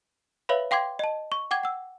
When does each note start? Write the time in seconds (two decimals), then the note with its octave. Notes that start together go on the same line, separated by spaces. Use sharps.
0.49 B4 C#5 E5 F5 B5
0.71 F5 G5 C6 D6 G#6
0.99 D#5 A5
1.32 C#6
1.51 F#5 G5 D6 G#6
1.63 F#5 E6